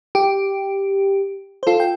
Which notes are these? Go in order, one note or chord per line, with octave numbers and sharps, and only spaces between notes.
G4
C5
F4 A4
G5